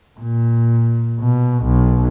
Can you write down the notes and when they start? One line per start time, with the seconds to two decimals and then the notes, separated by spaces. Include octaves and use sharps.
0.20 A#2
1.20 B2
1.63 B1